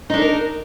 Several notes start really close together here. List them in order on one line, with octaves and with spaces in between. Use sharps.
D#4 D4 A4 A#4